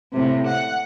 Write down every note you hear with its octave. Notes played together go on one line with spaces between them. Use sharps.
A2 C3
F#5